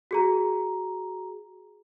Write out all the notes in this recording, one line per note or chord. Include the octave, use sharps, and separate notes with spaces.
F#4 G#4 A#5